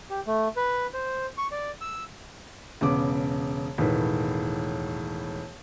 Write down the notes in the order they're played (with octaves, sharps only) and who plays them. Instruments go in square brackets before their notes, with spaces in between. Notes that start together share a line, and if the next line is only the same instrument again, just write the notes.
[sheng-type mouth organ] G4
A3
B4
C5
C#6
D5
E6
[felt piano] E1 C#3 B3 D6
E1 A2 D#3 B4